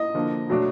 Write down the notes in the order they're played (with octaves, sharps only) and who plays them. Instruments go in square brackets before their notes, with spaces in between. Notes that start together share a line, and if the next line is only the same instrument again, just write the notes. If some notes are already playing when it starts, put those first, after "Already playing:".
Already playing: [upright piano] D#5
[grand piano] D3 F3 A#3
B2 F#3 A3 D4